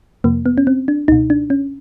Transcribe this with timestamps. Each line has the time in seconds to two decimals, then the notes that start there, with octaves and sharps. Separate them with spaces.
0.24 F2 C3 F3 A#3
0.46 B3
0.58 C#4
0.67 C4
0.88 D4
1.08 C#2 B2 D#4
1.30 D4
1.50 C#4